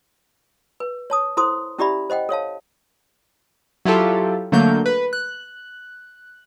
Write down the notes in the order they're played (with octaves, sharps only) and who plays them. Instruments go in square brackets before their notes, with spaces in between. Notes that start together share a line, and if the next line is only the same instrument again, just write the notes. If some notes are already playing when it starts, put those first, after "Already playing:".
[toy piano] B4
C#5 A5 D#6
E4 A4 C5 C6 D#6
C#4 E4 G4 D5 E5 B5
C5 D#5 F#5 G5
A4 C#5 F5 A5
[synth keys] F#3 E4 F4 G4 A4
D3 F#3 A3 A#3 G6
B4
F#6